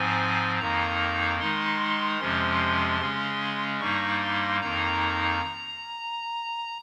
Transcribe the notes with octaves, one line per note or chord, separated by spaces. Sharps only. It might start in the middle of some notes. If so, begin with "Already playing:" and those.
Already playing: G#2 F3 C4 G#5
F2 D#3 A#3 D#4 A#5
D#3 G#3 D#4 C6
F2 C3 F3 G#3 C#4 C6
C#3 G#3 C#4
G2 G3 A#3 D#4 C#6
C6
F2 D#3 A#3 D#4 A#5